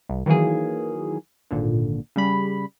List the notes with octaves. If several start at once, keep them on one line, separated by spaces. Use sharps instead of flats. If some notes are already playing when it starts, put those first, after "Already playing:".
C2
D#3 E3 F#3 A#3 G#4
G#1 A#2 D3
C#3 G3 B5